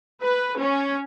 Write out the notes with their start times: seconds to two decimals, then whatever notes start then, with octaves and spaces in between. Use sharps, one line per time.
0.22 B4
0.58 C#4